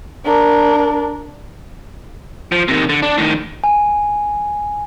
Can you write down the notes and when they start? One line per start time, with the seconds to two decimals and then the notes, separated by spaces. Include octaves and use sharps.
0.25 D4 A#4
2.52 F3
2.68 C3 D#3
2.89 D3
3.02 D4
3.18 A2 D#3
3.64 G#5